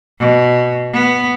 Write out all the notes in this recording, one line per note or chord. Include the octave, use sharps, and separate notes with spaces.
B2
B3